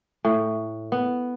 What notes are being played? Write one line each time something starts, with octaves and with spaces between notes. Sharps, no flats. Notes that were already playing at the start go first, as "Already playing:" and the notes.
A2
B3